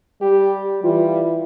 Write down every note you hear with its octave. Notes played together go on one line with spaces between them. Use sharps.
G3 G4
E3 G3 F4